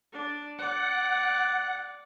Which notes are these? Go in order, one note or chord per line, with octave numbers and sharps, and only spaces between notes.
D4
D5 F#5